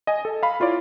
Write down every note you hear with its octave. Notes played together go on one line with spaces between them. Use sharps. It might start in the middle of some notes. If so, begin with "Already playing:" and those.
D#5 G#5
A4
F5 B5
E4 F4 C#5 D5